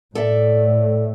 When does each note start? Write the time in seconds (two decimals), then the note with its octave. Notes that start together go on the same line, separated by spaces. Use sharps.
0.15 A2 A4 D5 E5